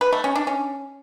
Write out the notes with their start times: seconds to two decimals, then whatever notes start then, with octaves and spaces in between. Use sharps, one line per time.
0.01 B4
0.13 A3
0.24 C#4
0.36 D4
0.47 C#4